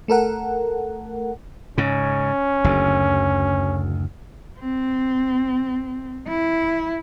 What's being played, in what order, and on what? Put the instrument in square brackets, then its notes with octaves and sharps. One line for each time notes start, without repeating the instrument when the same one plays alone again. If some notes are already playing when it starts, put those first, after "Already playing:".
[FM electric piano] A3 A4 A#4 F#5
[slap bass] G#2 C#3 [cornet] C#4
[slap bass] F#1 D2
[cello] C4
E4